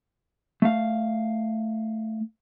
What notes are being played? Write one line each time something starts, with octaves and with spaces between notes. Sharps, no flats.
A3 F5